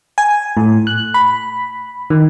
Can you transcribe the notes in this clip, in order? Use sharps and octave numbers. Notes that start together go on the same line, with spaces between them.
G#5
A2
F#6
B5
D#3